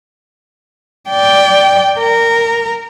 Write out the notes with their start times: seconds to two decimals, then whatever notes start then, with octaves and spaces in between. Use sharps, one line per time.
1.10 D5 G5
1.99 A#4